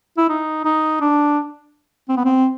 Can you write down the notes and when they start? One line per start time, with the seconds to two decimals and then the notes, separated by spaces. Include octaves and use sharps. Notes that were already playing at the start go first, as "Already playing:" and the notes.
0.18 E4
0.29 D#4
0.65 D#4
1.01 D4
2.09 C4
2.17 B3
2.25 C4